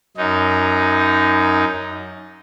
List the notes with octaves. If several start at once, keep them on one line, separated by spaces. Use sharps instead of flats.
F#2 D#4